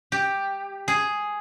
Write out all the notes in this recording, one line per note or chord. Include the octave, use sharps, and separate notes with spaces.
G4
G#4